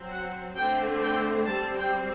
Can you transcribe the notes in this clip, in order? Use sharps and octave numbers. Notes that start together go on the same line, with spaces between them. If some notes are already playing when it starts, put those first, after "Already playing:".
Already playing: F#3 C4
F#5
D3 A3 C4 G5
G5
G3 C4 A5
G5